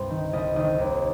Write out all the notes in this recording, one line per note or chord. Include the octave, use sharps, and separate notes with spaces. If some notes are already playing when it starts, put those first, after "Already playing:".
Already playing: C2 G2 C3 C5
D#3
C2 D#5
C3 D#3 D#5
D#2